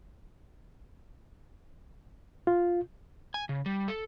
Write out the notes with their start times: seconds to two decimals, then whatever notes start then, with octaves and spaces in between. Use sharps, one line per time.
2.47 F4
3.34 G#5
3.49 C#3
3.66 G3
3.88 A4